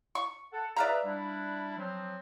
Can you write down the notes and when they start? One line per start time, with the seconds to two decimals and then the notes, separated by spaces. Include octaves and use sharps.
0.15 C#6
0.52 A4 F#5 A5
0.76 G#4 B4 D5 E5 F5 A#5
1.05 G3 D4 E4
1.77 F3 F#3 C4